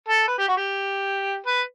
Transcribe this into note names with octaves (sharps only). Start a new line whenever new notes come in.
A4
B4
G4
F#4
G4
B4